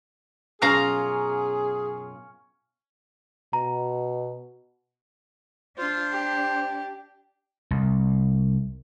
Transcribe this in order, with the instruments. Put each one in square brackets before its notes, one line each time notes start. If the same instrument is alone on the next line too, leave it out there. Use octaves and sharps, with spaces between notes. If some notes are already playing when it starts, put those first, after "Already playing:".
[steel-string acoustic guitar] F#2 B2 F4 [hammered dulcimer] C#4 [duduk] G#4 [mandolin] F5 A#5 F6
[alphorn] B2 [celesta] A#5
[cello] D4 [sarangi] F4 [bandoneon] C5
[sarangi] G4
[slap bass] C2